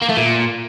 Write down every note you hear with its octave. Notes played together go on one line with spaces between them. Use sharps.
A#3
A3
A#2